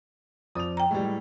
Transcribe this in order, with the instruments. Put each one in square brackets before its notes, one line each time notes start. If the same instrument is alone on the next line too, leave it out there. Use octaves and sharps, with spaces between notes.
[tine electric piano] F2 F3 D5 [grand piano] D#6 F7
[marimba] G5 A#5
[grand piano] A2 E3 G3 [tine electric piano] G#3